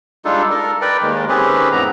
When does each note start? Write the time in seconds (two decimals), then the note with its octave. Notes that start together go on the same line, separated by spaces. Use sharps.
0.25 G3 G#3 D4 D#4 F4 A4
0.51 A4 A#4
0.81 A#4 B4 D5 G5
1.02 D#2 D#3 G#3
1.29 D#3 C4 C#4 G4 G#4 B4
1.72 F2 A2 B3 A#5